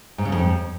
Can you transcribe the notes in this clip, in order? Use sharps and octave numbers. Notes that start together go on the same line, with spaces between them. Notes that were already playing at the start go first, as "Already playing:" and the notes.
G#2
C#3
F2